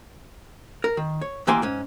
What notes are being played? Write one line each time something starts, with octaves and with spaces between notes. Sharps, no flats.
A#4
D#3
C#5
D#2 E3 A#3 G4 G#5 C6
G#2 C#4